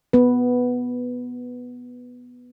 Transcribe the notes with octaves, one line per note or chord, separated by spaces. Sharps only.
B3 B4